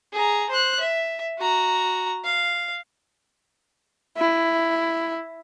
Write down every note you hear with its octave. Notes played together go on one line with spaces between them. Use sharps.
G#4 A#5
C5 F#6
E5
F#4 A#5
F5
E4